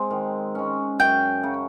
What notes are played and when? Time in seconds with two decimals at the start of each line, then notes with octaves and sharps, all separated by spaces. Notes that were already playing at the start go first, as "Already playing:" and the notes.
Already playing: G#3 C4
0.10 D#3
0.55 G#3 C#4
0.99 F#2 G5
1.43 C#3 F#3